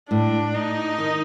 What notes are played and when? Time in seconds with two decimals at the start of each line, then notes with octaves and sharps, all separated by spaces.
0.10 A2 D4
0.55 D#4
0.98 D#3